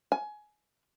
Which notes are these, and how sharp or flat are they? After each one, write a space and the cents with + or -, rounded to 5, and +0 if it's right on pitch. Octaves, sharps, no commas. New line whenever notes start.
G#5 +20